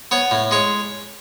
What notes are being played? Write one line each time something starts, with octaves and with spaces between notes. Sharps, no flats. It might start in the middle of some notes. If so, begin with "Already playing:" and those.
B3 C#5
A2
G#3 C#5